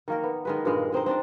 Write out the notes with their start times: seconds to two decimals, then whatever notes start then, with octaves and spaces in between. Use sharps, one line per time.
0.08 D#3 A#3 A#4
0.23 B3
0.45 D#3 G#3 B4
0.65 G2 A#2 G#3 F5
0.92 G#3 C4 D#4 C5
1.06 C4 D4 D#4 D5